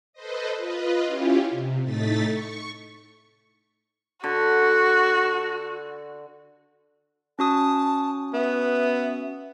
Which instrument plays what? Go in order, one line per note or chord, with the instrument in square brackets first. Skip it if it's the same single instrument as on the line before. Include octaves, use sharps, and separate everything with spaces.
[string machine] A4 B4 C5 D#5
F4 B4 D#5
C#4 E4 F4 G4
C3
A2 A3 D#4 A6 B6
C#6
[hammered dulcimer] D3 [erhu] F#4
[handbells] C#4 F#4 D#6 [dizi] A5
[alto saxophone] B3 [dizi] E5